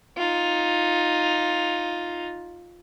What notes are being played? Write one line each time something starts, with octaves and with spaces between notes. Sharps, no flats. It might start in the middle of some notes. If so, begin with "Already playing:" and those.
D#4 F4